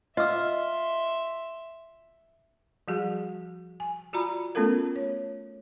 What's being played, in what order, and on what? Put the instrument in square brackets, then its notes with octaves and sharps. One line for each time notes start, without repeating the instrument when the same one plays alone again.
[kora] F4 [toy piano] D#5 E6 [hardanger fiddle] E5 C6
[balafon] F3 G3 F#4 G#4
G#5
F4 F#4 D5 A#5 B5
A3 B3 C#4 F4 A4 A#4
C#5